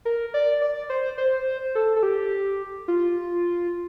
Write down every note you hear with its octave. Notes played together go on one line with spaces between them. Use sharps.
A#4
D5
D5
C5
C5
A4
A4
G4
F4